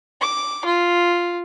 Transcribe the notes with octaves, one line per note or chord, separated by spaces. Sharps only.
D6
F4